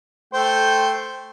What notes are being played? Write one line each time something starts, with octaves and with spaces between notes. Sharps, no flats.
A3 C5 G5